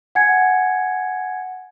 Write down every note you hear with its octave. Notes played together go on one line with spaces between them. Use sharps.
F#5 G#5 G#6 C#7